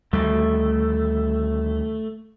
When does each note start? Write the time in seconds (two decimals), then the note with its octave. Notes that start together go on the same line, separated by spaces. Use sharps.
0.13 D2 D#3 G3 A3